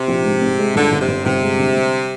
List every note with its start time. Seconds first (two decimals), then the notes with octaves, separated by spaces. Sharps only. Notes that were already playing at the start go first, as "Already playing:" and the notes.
Already playing: C3
0.08 A#1
0.25 G#2
0.42 G#2
0.59 G#3
0.76 G1 D3
0.92 G1
1.01 C3
1.08 G1
1.25 G1 C3
1.42 G#3
1.59 D3
1.76 G3